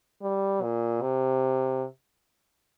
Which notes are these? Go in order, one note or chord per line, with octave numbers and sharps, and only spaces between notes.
G3
A#2
C3